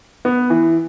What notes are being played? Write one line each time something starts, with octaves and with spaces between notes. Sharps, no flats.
B3
E3